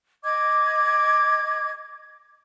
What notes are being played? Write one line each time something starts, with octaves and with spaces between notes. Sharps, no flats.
D#5 D6 G#6